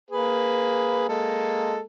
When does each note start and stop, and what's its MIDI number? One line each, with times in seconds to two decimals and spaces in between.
0.11 1.07 58
0.11 1.07 68
0.11 1.07 71
1.09 1.80 56
1.09 1.80 58
1.09 1.80 69